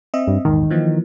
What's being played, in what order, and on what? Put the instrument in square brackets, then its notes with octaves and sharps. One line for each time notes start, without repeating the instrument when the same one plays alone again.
[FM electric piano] C4 D#5 E5
[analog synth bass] G2
[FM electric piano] A#1 E2 G#2 [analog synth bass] D#3
[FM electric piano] E3 F3 A#3